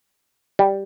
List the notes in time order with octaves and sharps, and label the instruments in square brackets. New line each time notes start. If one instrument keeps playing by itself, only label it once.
[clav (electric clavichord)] G3